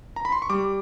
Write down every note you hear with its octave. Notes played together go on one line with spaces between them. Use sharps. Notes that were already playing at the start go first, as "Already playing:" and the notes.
A#5
B5
C6
C#6
G3 D6